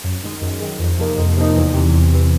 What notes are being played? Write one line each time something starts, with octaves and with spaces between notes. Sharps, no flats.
F#2
D#3 G#3
F#2
D#3 G#3
F2
C3 F3 A#3 D#4
F2
C3 F3 A#3 D#4
E2
C3 E3
E2
C3 E3